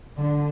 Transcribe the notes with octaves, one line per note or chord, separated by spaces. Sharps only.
D3